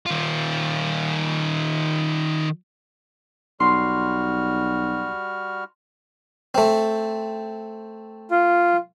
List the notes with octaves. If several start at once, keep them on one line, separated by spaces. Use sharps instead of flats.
D#3 F4
B1 G3 F#4 C6 F6
A3 C4
F4